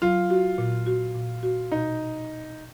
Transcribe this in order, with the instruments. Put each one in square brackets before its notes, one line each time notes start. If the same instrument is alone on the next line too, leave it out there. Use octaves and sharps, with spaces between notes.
[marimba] F#3 [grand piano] F4
[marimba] F#4
A#2
F#4
A#2
F#4
[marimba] B2 [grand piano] D#4